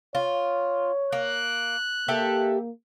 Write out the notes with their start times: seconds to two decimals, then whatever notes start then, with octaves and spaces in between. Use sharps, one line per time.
0.15 F4 C#5
1.12 A#3 F#6
2.08 A#3 G4 A4 E5